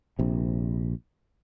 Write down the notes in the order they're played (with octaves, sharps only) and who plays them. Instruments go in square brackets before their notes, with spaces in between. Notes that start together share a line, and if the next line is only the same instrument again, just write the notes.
[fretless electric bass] A#1 C3